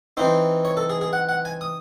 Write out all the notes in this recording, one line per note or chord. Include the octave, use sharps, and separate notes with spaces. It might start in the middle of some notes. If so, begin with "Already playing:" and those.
E3 C4 D#4 C5
C#5
A4
G#4
G#4
F#5
F#5
G#5
D#6